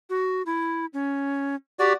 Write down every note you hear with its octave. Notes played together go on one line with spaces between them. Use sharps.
F#4
E4
C#4
F#4 G4 D5